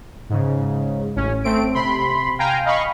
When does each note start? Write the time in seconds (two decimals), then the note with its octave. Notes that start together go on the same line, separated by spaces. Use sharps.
0.29 G#2 C#3
1.15 A1 C#4
1.44 A3 C4 D7
1.74 C3 B5 C6
2.39 F5 G5 G#5 A#5
2.65 D#5 F5 B5 C#6